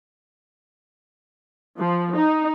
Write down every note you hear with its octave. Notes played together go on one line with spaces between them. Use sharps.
F3
D#4